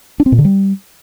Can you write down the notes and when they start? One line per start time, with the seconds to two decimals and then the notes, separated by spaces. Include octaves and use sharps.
0.20 D4
0.26 C4
0.32 A#2
0.38 D3
0.45 G3